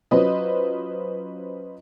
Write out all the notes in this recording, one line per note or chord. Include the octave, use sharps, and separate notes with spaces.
F#3 C#4 F4 B4 C5 D#5